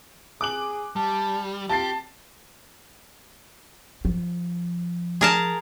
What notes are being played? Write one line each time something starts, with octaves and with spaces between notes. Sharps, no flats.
G#4 D6 F#6 F#7
G3 A5
F4 G4 A5 A6 C7
F3
G#4 A#4 A5